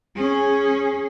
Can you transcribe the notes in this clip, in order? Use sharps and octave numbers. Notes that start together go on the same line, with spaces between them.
C#4 G#4